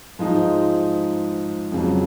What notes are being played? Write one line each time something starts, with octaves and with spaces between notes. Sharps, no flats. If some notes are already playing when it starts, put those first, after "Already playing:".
G#2 F3 G#3 D#4
F2 C#3 F#3